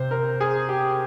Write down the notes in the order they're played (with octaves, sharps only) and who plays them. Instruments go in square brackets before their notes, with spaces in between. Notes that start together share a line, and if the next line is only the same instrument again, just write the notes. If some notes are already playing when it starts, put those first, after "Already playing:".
Already playing: [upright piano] C3 [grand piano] C5
[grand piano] A#4
G#4
G4